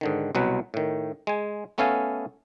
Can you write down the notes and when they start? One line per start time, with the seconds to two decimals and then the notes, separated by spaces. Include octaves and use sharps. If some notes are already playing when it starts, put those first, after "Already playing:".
0.01 G#2 D3 D#3
0.35 C2 B2 F#3 B4
0.74 A2 D#3
1.27 G#3 G#5
1.78 A3 B3 C#4 A4 F5 G#5